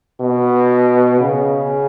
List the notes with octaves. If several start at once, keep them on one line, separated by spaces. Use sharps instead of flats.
B2
C#3